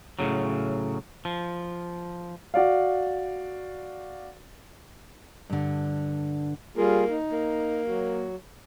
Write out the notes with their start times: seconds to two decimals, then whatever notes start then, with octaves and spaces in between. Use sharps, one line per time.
0.19 A2 C#3 F#3
1.25 F3
2.54 F#4 D5 F5
5.50 G2 D3
6.77 G3 A#3 F4 G#4
7.09 D#4
7.32 A#3
7.87 F#3 F#4